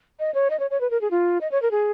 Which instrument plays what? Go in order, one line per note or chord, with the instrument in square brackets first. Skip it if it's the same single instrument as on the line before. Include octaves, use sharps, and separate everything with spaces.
[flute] D#5
C#5
D#5
C#5
C#5
B4
A#4
G#4
F4
D#5
C#5
A#4
G#4